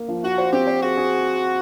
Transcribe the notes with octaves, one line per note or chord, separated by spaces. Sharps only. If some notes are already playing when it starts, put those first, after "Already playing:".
Already playing: A#3
F3
F4 F#4
C5
C4 G4
C5
F#4 G#4
G#4